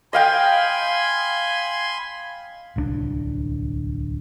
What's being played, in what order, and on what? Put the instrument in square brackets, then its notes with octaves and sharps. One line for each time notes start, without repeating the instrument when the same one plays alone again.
[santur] D#5 F5 G5 [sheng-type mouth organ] G#5 B5 C6
[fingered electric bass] D1 C2 C4 D4